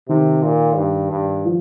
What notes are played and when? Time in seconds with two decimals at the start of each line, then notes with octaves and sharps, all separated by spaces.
0.09 C3 D#3
0.43 A#2
0.77 G2
1.11 G2
1.45 F3